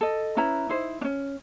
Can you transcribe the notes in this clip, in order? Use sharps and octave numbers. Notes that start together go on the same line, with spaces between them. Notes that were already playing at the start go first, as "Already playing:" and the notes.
A4 D#5
C#4 E4 B4 A#5
D#4 E4 C5
C#4 D4